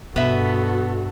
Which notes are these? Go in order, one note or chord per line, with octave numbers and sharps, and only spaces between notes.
G2 B2 B3 F#4 A4 E5